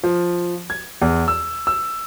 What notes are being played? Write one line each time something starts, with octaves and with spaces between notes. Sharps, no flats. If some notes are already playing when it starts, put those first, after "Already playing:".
F3
G#6
E2
E6
E6